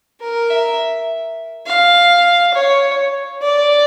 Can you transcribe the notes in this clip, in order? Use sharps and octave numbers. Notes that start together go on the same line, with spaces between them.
A#4
E5
F5
C#5
D5